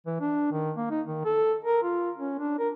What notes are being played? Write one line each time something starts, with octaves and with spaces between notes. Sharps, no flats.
E3
D4
D#3
A#3
D#4
D#3
A4
A#4
F4
C#4
D4
A#4